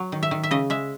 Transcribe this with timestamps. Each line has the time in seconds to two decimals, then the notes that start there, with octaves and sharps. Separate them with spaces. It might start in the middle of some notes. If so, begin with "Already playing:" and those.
Already playing: F#3
0.12 D#3
0.23 E5
0.31 D#3
0.43 E5
0.51 C#3 D#5
0.70 G#3 E5